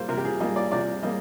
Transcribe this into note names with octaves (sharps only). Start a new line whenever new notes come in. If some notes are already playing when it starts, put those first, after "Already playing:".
Already playing: G3 A#3 C5
C3 A#4
G4
G#4
G3 A#3 D#5
D5
C3 D5
G3 A#3 D#5